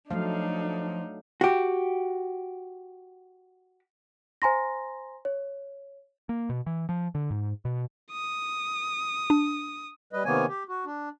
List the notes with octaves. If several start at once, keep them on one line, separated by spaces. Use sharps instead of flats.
F3 F#3 A3 D4 D#4 F5
F#4 G4
C5 G#5 A#5 C6 A#6
C#5
A#3
B2
E3
F3
D3
G#2
B2
D#6
D4
G3 B4 D#5
C3 D#3 A#3 B3 C#5 G#5
G4
F#4
D4